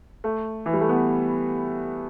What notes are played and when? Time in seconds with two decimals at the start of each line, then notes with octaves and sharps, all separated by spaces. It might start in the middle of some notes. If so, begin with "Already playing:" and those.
0.24 A3
0.66 E3
0.73 G3
0.81 A3
0.89 B3